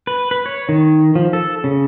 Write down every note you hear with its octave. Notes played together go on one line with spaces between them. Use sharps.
B4
B4
C#5
D#3
F3
A4
C#3